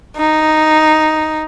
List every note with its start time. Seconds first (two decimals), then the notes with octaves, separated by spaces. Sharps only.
0.16 D#4